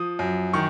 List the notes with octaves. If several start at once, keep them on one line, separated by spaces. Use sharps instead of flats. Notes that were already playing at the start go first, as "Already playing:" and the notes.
Already playing: F3 D#6
F#2
D#3 C#6